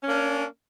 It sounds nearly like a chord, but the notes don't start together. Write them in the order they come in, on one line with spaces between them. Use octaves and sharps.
C#4 A#3 D4